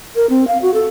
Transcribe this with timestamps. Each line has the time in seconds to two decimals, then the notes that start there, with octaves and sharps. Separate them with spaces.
0.16 A#4
0.29 C4
0.48 F5
0.62 F#4
0.74 A4